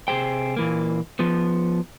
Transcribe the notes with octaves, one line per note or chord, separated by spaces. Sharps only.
C3 F3 G#4 C5 G5
A#2 E3 A#3
F3 B3